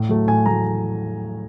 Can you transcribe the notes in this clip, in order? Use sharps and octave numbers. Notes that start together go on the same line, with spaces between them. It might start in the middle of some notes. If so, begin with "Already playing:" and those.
Already playing: A2 F5
F#3 A3
A2 G#5
F#3 A3 A#5